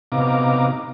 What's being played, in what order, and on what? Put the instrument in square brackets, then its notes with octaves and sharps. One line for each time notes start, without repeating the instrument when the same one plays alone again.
[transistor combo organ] C3 B3 D#4 F5 A#5 D6